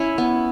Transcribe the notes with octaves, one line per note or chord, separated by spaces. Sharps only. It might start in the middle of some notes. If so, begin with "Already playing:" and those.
Already playing: C#4 E4
B3